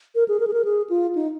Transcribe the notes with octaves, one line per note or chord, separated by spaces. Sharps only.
A#4
G#4
A#4
G#4
A#4
G#4
F4
D#4